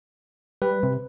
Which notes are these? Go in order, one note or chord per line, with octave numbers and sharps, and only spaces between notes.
G3 B4
C3